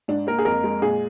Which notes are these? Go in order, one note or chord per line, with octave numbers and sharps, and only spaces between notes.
G#2 D4
A#3 A#4
G#4
F2 A#4
G#3
A#2 G#4